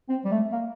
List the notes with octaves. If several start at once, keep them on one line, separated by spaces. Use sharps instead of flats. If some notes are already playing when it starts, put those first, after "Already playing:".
C4
G3
A3
A#3